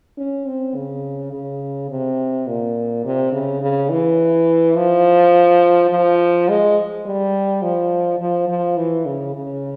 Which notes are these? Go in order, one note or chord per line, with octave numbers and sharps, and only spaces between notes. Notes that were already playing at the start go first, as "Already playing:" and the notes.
C#4
C4
C#3
C#3
C3
A#2
C3
C#3
C#3
E3
F3
F3
G#3
G3
F3
F3
F3
E3
C#3
C#3